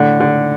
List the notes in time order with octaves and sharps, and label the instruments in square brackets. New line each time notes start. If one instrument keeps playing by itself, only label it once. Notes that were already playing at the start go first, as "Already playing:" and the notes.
Already playing: [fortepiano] A2 D3
D3